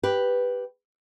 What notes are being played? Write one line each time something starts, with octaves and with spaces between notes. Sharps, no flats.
G4 B4